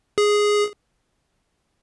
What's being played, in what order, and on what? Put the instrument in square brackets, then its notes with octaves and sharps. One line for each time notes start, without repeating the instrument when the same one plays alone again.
[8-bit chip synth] G#4